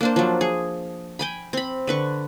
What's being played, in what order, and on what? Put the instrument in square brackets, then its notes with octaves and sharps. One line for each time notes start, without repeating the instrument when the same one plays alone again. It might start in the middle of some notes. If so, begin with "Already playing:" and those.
[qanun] A#3 D4 C5
F3 F#3
G#4
G5 G#5 B5
C4 B5
D3 B4 C#6